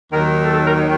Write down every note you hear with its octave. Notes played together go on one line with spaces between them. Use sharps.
D#2 D#3 F#3 A#4
A4
A4
A#4